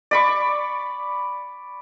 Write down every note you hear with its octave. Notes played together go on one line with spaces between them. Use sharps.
D5 B5 C#6